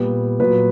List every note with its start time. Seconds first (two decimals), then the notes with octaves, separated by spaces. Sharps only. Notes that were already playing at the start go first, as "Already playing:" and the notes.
Already playing: A#2 G3 B3
0.40 A#2 F#3 B3 B4